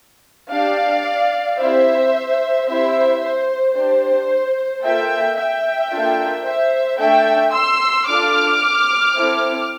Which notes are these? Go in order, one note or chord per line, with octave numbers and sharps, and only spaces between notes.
D4 G4 D5 F5
C4 E4 G4 C5 E5
C4 E4 G4 C5 E5
C5
D4 G4 C5
A#3 F4 A4 E5 G5
E5 G5
A#3 D4 F4 A4
C5 E5
A3 D4 A4 E5 G5
C6 E6
D4 F4 A4 D6 F6
C4 E4 A4